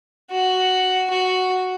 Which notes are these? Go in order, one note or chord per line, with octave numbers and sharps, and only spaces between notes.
F#4
F#4